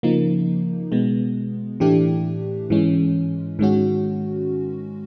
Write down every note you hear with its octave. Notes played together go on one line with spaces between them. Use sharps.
C#3 F3 A#3 D#4
B2 G#3 B3
A2 E3 A3 D4 G4
G#2 E3 G#3 C#4
G#2 D#3 G#3 C#4 F#4